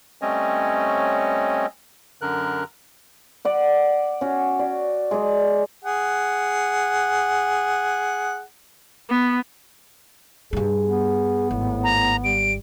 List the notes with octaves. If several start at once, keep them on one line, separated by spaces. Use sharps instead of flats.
G3 A3 C4 C#4 C#5 D#5
F#2 D3 A#4 F#6
D5 F#5
C#4 F#4
D5
G#3 D5
G#4 F#5
B3
G2 G3 G#4
B3
G#1 A2
A#5
G3 D7